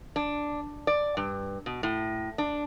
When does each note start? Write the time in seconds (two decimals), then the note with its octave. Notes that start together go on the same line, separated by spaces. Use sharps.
0.16 D4
0.87 D5
1.17 G2
1.66 B2
1.83 A2
2.38 D4